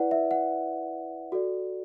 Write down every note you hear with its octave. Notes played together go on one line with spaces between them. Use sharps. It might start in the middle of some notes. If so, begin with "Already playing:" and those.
Already playing: E4 B4 D5 F#5
E5
F#5
F#4 A4 D5